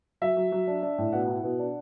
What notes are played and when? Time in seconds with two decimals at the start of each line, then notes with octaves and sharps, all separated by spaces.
0.21 F#3 E5
0.37 F#3
0.52 F#3
0.67 D4
0.82 D4
0.98 A2
1.12 B2 F#5
1.28 E4
1.44 B2
1.59 D4